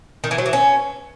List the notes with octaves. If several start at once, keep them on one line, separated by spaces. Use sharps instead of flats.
D#3
E3
F#3
E3
C#4